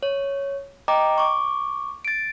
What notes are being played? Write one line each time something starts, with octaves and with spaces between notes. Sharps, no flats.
C#5
D#5 G5 A#5 D6
C#6 D6
A6 D7